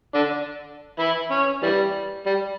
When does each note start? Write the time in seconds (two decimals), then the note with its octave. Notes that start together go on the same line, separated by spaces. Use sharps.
0.14 D3 D4
0.99 E3 E4
1.31 C#4
1.62 E3 G3
2.26 G3